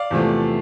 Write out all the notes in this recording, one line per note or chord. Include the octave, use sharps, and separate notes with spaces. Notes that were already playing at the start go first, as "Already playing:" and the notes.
Already playing: D5 F5
E2 C3 F3 A3